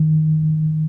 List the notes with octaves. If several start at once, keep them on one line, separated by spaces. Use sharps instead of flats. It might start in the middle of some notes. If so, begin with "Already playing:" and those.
Already playing: D#3